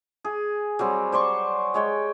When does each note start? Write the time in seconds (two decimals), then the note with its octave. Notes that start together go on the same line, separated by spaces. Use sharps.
0.25 G#4
0.79 F#3 G3 C4
1.12 C5 D5 C6 C#6
1.74 G#3 C#5 G5